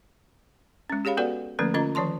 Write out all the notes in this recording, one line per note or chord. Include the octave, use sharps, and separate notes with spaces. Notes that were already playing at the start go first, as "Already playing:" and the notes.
G#3 C#4
G4 G#4 C#5 F5 B5
B3 F#4 A4 B4 D5 F#5
D3 F3 A3 A#3 C#4 B4
D3 C#4 F4 D#5 A#5
D#3 F3 C#5 A5 C6